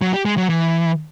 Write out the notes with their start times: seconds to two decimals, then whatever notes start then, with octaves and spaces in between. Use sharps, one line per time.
0.02 F#3
0.13 G4
0.25 G#3
0.37 F#3
0.49 E3